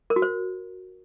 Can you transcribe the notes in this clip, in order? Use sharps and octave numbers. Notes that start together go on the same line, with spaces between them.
A#4
F#4
C5